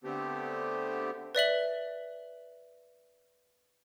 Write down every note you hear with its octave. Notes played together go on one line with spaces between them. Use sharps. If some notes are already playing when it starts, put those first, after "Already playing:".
D3 A3 B3 C4 G4
B4 D5 E5 F#7